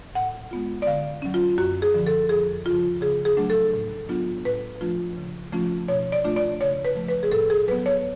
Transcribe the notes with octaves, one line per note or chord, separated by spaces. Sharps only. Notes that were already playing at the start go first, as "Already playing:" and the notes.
A2 F#5
G#3 B3 F4
D5
D3 F5
F#3 C#4
F4
F#2 F#4
G#4
D3 F3
A4
F2 G#4
C#3 F3 F4
C#3 G#4
G#4
F#3 A3 D4
A4
A2
F#3 B3 D4 F4
A2 B4
F3 A3 D4 F4
C#3
F3 A3 C#4 F4
B2 C#5
D5
A3 D4 F4
D5
C#3 C#5
B4
F3 A3
B4
G#4
A2 A4
G#4
F#3 B3 B4
C#5